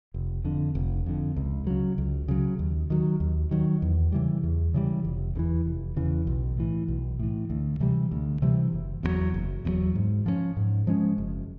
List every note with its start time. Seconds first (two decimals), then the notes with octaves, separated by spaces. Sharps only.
0.14 F1
0.44 F2 D3
0.75 F1
1.06 F2 D3
1.36 C#2
1.67 C#3 F#3
1.98 C#2
2.28 C#3 F#3
2.59 D#2
2.90 D#3 F#3
3.20 D#2
3.51 D#3 F#3
3.82 E2
4.12 C#3 E3 G3
4.43 E2
4.74 C#3 E3 G3
5.05 F1
5.35 E2 C#3 E3
5.66 F1
5.96 E2 C#3 E3
6.27 B1
6.57 A2 E3
6.88 B1
7.19 A2 E3
7.50 D2
7.80 C3 E3 G3
8.11 D2
8.42 C3 E3 G3
8.73 F#1
9.03 E2 B2 F#3
9.34 F#1
9.65 E2 B2 F#3
9.95 G#2
10.26 F3 G#3 C#4
10.57 G#2
10.87 F3 G#3 C#4
11.18 F#1